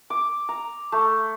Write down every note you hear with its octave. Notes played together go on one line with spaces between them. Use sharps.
D6
A#5
A3